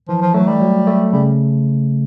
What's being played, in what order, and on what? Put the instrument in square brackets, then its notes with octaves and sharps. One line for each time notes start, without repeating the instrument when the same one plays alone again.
[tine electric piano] E3 [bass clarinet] F3
[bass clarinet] F3
[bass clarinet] F#3 [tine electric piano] A3
[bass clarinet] G3
[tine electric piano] F#3
A3
[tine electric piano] C#3 [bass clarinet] G3